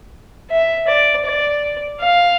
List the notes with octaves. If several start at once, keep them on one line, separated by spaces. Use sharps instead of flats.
E5
D5
D5
F5